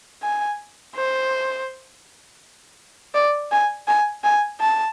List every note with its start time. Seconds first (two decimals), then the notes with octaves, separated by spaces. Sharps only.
0.22 G#5
0.96 C5
3.15 D5
3.51 G#5
3.88 G#5
4.24 G#5
4.60 A5